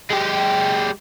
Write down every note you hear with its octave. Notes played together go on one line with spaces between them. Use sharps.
G#3 G4